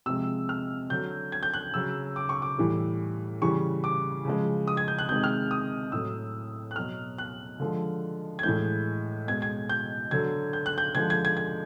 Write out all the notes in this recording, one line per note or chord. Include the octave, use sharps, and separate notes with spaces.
C3 F3 G#3 E6
F6
D3 F#3 G6
G#6
G6
F#6
C#3 F#3 E6
D6
C#6
D6
A2 E3 G3
C#3 E3 G3 C#6
D6
C#3 F3 G#3
D#6
G#6
G6
F#6
C3 D#3 G#3 G6
F6
D#6
A2 F#3 E6
F#6
B2 F#3 F6
F#6
D3 F3 G#3
G#6
A2 E3 G#3 G6
B2 G#3 G#6
G#6
G6
D3 F#3 G#6
G6
F#6
G6
D3 F3 G#3 G#6
G#6
G#6
G#6